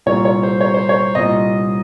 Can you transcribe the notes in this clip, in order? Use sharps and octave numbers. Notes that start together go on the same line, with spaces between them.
C2 A#2 C#5
C#5
C5
C#5
C5
C#5
C2 A#2 D#5